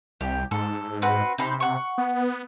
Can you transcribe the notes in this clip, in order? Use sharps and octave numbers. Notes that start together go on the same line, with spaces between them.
C2 G4
G#2 A4
C4 F#4 B4
C3 D#4 C5 B5
F#5 C#6
B3